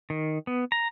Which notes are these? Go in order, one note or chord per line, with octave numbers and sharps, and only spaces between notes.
D#3
B3
A#5